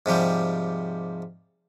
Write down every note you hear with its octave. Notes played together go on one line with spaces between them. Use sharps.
G#2 C3 F3 G3